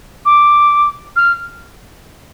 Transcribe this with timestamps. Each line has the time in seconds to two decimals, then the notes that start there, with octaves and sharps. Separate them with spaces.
0.25 D6
1.16 F6